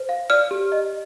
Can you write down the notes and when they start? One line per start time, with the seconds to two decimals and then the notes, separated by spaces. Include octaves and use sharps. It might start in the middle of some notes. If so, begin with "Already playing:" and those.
Already playing: C5
0.09 F5
0.30 D5 F6
0.51 G4
0.72 D#5